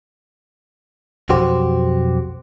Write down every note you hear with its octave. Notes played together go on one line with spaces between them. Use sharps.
B1 F2 F#4 G4 C5